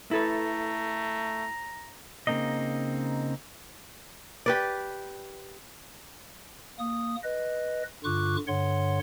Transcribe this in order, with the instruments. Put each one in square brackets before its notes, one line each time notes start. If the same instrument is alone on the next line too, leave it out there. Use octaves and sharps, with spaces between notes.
[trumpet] A3 [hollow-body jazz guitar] E4 A4 B4 [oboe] A#5
[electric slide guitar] C#3 A#3 C4 D#4 D#5
[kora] G4 B4 D5
[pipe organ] A#3 D#6
B4 D#5
G2 D3 F4 C#6 D6 F#6
G2 D3 C#5 F#5 C6